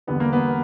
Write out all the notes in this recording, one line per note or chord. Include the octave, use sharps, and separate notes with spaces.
E2 D3 G3 B3
A#3
B3